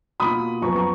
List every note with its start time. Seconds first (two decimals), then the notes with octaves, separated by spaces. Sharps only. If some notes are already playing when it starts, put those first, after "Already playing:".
0.20 B2 A#3 F4 B5 D#6
0.62 F#2 F3 B3 A#5 C#6
0.76 A#5 C#6